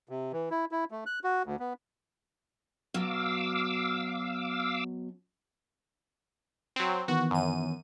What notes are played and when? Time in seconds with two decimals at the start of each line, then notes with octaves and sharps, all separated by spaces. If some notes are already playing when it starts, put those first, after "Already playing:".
0.09 C3
0.33 E3
0.51 E4
0.71 E4
0.91 A3
1.06 F#6
1.24 F#4
1.45 D2
1.60 B3
2.94 B2 F#3 F5 D6 E6
6.76 F#3 C4
7.08 D#3 E3 B3 F#4
7.31 F#2 D#7